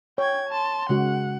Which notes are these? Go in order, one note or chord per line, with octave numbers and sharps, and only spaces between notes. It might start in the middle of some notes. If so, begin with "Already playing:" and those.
C#5 G5 G#6
A5 C6
C#3 G#3 F#4 F#5